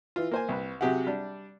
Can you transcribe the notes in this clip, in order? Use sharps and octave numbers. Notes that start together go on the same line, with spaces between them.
E3 F4
A#3 C5 G#5
C2 B4
C3 F#3 G4 G#4 F#5
G3 D4